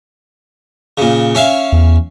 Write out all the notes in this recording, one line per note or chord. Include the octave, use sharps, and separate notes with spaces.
A#2 C#3
C#4 E5 F5
E2